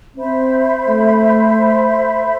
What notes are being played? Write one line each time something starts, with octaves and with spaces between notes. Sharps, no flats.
C4 C5 E5 B5
A3